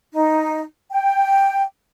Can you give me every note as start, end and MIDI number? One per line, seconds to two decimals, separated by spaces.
0.14 0.61 63
0.90 1.62 79